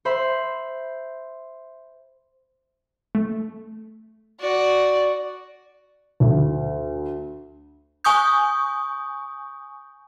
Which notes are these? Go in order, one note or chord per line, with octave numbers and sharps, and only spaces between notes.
C5 E5 B5 C6
A3
F#4 D5
D2
G#5 C#6 D#6 G6